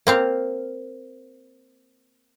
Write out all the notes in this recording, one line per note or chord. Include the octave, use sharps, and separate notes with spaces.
A#3 C4 F5